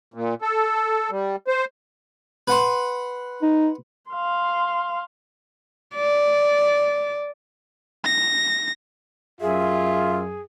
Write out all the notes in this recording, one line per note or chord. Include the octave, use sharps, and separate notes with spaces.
A#2
A4
G3
C5
B4 F#5 C6
D#4
F5 C6
D5
A#6
F#2 F4 G#4 E5